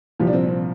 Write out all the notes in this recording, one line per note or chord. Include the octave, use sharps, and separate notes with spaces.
C2 A#2 F3 G4
D4
C4
C4